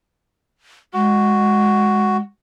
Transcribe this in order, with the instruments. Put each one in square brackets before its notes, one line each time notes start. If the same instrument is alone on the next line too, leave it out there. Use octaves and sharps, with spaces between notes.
[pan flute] G#3 [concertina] F#4